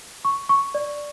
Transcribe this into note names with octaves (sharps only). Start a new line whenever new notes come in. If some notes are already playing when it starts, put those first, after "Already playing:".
C#6
C#6
D5